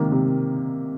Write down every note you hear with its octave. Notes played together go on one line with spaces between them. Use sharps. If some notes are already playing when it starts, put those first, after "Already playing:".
Already playing: C3 D#3 A#3
C3